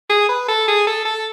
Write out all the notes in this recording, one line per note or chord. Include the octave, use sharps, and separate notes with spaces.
G#4
B4
A4
G#4
A4
A4